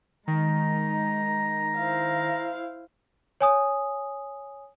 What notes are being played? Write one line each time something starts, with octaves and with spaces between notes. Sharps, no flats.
D#3 G#3 D#4 A#5
E4 C5 F5
C#5 G#5 D#6